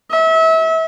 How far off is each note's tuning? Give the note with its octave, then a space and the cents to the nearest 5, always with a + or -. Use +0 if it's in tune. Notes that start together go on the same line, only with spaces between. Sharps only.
E5 -30